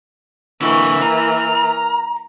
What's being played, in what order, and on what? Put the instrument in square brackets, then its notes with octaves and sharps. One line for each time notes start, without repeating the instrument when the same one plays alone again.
[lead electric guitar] D3 E4 [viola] E3 A#3 [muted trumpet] C#6
[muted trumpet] A#4 [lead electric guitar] A#5